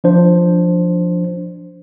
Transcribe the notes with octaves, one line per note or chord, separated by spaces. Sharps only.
F3 D4 C5